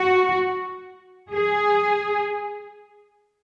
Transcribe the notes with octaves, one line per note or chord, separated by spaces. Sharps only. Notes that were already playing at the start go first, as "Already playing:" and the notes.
Already playing: F#4
G#4